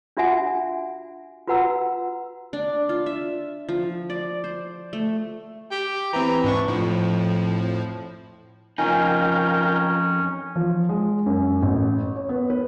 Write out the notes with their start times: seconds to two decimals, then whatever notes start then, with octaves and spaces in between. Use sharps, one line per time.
0.17 D4 F4 F#4 E5 F#5 G#5
1.47 F4 F#4 B4 F#5 A#5 E6
2.53 D4
2.89 F4
3.06 E5
3.69 F3
4.10 D5
4.44 C5
4.93 A3
5.71 G4
6.13 E3 C4 A#5
6.44 G#2 D4 C#6
6.68 F2 A2 F3
8.78 F2 C#4 D#4 F4 A#4 G5 G#5
10.56 F3
10.89 G#3
11.26 F#2
11.63 A1
12.16 C#5
12.29 B3
12.50 B4